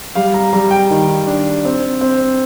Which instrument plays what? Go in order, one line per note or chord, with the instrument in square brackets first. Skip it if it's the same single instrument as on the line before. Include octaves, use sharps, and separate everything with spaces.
[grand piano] G3 F5
A#5
G3 A#5
G5
D#3
D4
C4
C4